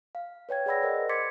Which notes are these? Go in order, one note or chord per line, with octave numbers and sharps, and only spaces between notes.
F5
B4 C#5 G5 G#6
G#4 D5 F#5 B5 E6 A#6
A#4 C5 D#5
C6 D6 G#6 A6 B6 C#7